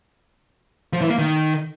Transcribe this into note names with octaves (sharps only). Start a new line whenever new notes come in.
F3
E3
A#3
D#3